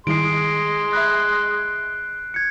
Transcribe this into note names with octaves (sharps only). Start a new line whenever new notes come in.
D#3 G3 G#3 E4 C6 C7 D7
E5 B5 F#6 G#6
G#6 C#7